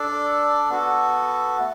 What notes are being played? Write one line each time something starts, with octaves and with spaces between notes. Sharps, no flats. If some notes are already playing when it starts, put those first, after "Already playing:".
Already playing: D4 A4 D5
B3 F#4 A4
A3